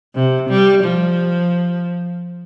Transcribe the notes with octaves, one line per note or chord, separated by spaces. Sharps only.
C3
G3
F3